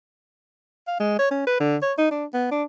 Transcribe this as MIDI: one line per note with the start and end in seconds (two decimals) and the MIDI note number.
0.88 0.99 77
1.00 1.18 56
1.19 1.29 73
1.31 1.45 61
1.47 1.58 71
1.60 1.77 50
1.82 1.93 73
1.98 2.11 63
2.11 2.25 62
2.34 2.49 59
2.51 2.64 62